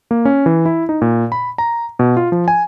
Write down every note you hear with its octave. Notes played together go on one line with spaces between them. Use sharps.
A#3
C#4
E3
E4
D#4
A#2
B5
A#5
B2
F4
F3
G#5